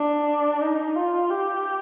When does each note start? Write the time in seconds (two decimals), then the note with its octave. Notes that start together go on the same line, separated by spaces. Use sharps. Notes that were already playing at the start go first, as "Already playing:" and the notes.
Already playing: D4
0.61 D#4
0.96 F4
1.30 G4